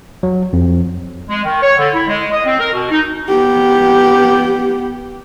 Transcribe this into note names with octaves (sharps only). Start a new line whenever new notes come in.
F#3
F2
G#3
D#3
C#5
D3
E4
G#3
D#5
C4
A#4
B2
D#4
B3 G4